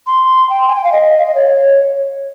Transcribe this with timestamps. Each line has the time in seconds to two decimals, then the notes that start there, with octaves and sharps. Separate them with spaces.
0.07 C6
0.50 G5
0.68 G#5
0.76 G5
0.84 F5
0.92 D#5
1.17 F5
1.26 D#5
1.35 C#5